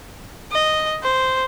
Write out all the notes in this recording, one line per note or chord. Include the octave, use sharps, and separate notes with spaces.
D#5
C5